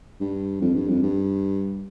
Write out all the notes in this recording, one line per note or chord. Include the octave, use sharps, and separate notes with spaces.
G2
F2
G2
F2
G2